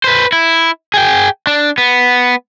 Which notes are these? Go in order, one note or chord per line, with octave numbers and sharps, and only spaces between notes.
B4 C5
E4
G#4 G5
D4
B3